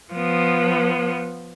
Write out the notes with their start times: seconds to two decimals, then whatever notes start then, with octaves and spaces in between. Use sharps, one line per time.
0.13 F3 B3